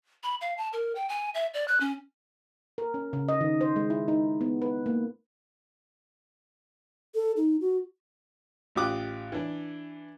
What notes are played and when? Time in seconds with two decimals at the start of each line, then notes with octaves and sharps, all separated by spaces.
0.23 B5
0.41 F5
0.57 A5
0.73 A#4
0.95 G5
1.09 G#5
1.35 E5
1.54 D5
1.68 F#6
1.80 C#4
2.78 A#4
2.94 C#4
3.13 C#3
3.29 D#5
3.41 D#3
3.61 C5
3.76 G#3
3.90 E4
4.08 D#4
4.41 B3
4.62 B4
4.86 A#3
7.15 A4
7.37 D#4
7.61 F#4
8.75 A1 F4 G4 D6 D#6 F#6
9.32 E3 D4